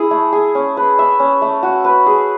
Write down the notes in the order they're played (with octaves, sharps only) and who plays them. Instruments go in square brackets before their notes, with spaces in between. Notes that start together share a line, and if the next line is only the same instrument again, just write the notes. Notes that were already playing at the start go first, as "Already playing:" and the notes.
Already playing: [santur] E4 G#4
A3
G#4
C#4
B4
E5
C#4
A3
F#4
B4
G#4